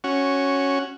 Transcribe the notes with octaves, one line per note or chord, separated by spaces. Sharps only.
C#4 F#4